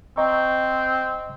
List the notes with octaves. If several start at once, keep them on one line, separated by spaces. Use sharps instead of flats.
C4 D#5 A#5 C#6